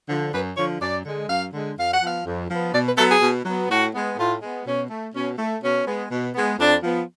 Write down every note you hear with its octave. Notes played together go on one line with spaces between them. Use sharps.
D3 F3
F#2 B4
D3 F3 C#5
F#2 D5
D3 G#3
F#2 F5
D3 G#3
F2 F5
F#5
F3 B3 F5
F2
F3 B3
B2 D5
B4
F#3 B3 A4
G#4
B2
F#3 B3
A2 F#4
G#3 B3
A2 F4
G#3 B3
B2 C#4
A3
B2 C#4
A3
B2 C#4
G#3 B3
B2
G#3 B3
F2 D4
F3 B3